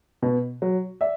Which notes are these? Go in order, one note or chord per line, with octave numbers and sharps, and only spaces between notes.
B2
F#3
D5 E5